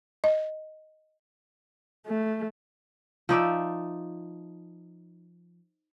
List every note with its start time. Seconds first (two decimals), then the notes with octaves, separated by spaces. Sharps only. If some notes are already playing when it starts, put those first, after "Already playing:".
0.24 D#5
2.07 A3
3.29 F3 D#4 D5 E5